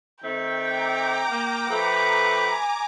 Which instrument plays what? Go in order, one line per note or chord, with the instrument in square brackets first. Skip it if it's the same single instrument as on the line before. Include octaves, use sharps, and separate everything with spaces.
[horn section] D#3 A3 C4 [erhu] G5
[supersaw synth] A#5 D6
[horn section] A#3
[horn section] F3 A3 A4 [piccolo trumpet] B4
[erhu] G#5